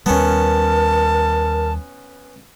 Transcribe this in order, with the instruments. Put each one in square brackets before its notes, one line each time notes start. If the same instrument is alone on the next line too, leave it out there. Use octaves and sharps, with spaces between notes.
[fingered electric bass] D#2 G3 [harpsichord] B3 C#4 [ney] A#4 [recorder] A5